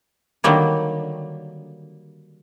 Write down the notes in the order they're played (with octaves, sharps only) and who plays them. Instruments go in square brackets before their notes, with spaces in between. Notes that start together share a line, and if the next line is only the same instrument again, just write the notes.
[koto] D3 D#3 F#3 G3 A#3